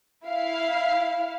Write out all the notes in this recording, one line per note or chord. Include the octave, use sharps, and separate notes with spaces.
E4 F5